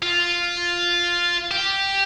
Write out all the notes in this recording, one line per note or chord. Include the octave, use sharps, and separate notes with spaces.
F4
G4